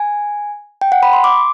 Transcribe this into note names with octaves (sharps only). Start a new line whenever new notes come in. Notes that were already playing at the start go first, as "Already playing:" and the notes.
Already playing: G#5
G5
F#5
B5
C6
D6